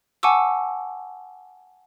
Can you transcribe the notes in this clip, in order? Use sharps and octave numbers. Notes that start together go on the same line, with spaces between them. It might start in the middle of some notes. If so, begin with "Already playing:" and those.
F#5 G#5 A5 C#6 D6 E6